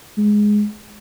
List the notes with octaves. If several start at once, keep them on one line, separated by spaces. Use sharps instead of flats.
G#3